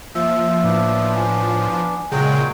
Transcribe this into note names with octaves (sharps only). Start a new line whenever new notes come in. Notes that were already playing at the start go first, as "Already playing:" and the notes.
F3 A#3 E5 E6
A2 B3 D4
G#5
A#2 C#3 F#3 G#3 G5